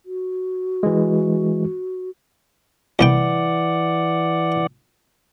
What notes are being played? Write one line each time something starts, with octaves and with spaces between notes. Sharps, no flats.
F#4
E3 G#3
C2 E3 B3 D5 F#5 G5